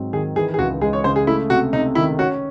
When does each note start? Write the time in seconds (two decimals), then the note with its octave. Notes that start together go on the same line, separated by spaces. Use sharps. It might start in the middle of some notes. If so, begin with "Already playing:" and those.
Already playing: G#2 F#3 C4
0.13 D#3 G#4
0.36 E3 G#4
0.54 G#4
0.58 C#2 F#4
0.81 G#3 G#4
0.93 C#5
1.04 C#3 C5
1.16 G#4
1.27 A3 E4
1.50 C3 F#4
1.73 C3 D#4
1.95 D#3 E4
2.19 C#4 F#4